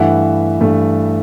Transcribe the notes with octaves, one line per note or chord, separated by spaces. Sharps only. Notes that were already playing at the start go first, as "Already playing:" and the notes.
Already playing: G2 E3 A3 E5 F#5
G2 E3 A3